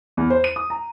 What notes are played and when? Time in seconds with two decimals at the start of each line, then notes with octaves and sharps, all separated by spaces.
0.17 E2
0.30 C5
0.44 D#7
0.56 D#6
0.70 A#5